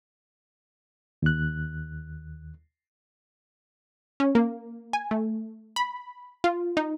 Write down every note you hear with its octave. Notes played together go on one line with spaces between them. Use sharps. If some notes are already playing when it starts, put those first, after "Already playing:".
D#2 F#6
C#4
A#3
G#5
A3
B5
F4
D#4